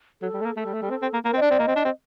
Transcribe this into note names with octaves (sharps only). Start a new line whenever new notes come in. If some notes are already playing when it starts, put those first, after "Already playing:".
F#3 A4
G3
A3
A#3
A3 A4
G3
A3
G3
C4
C4
A#3
A#3 A#4
C4
D#5
D4 D5
C4
A#3 D#5
C4
D4
C4